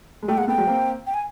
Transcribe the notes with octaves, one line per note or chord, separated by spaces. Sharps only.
G#3
G3 A3 G5
G#3 A#3 F#5
A3 B3 G5
F#3 G#3
A#3 C4
G5
G#5